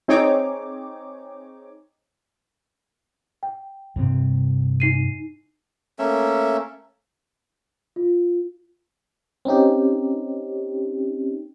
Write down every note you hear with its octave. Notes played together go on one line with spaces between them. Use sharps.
C4 D#4 G#4 C#5 D6
G5
G2 C3 C4
D#4 C7 D#7
A3 A#3 C#4 E5
F4
C4 C#4 D#4 G4